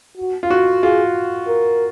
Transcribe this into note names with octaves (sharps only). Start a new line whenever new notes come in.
F#4
F4
F#4
F4 G#4
A#4